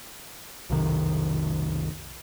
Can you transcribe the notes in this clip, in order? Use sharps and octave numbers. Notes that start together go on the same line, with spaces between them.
B1 F2 C3 D#3